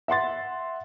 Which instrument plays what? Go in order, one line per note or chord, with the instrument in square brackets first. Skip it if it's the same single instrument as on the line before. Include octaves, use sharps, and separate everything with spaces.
[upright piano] E5 F#5 C6 A6